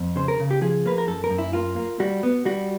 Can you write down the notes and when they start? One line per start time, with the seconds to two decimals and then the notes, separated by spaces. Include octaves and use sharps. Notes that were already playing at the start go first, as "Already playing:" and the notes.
Already playing: F2
0.16 C#3 C5
0.28 A#4
0.40 C#3
0.51 G4
0.61 F3 G#4
0.86 A#3 B4
0.98 A#4
1.07 F#2 A4
1.24 A#4
1.30 F#2
1.38 E4
1.53 A#3 F4
1.76 A#3
2.00 G3 F#4
2.23 B3
2.45 G3 F#4